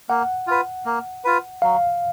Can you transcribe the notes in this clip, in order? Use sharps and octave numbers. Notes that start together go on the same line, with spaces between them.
A#3 F#5
F4 B4
A#3
F4 B4
F#3 F5